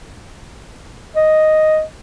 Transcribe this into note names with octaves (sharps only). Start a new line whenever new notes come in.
D#5